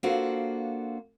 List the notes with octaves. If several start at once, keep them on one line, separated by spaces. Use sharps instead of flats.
A#3 D4 F4 F#4 A4 C5